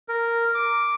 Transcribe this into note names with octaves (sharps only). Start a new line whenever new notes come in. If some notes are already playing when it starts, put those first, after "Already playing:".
A#4
D6